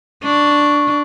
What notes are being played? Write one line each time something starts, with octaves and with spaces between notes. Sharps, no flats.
D4 C#6